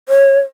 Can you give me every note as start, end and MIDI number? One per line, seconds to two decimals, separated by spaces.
0.09 0.38 73